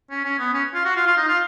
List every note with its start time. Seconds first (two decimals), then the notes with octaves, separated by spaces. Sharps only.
0.10 C#4
0.25 C#4
0.39 B3
0.53 C#4
0.74 F4
0.85 F#4
0.96 F4
1.07 F4
1.17 D#4
1.28 F4